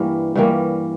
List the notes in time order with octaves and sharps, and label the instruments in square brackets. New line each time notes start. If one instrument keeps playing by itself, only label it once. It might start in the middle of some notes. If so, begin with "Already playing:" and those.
Already playing: [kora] G2 E3 G3 A#3 A#4
G2 E3 G3 A#3